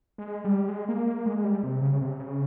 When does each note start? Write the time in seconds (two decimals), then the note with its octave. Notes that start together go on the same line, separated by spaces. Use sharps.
0.18 G#3
0.45 G3
0.69 G#3
0.89 A#3
1.07 A#3
1.26 G#3
1.44 G3
1.63 C3
1.82 C#3
2.01 C3
2.20 C#3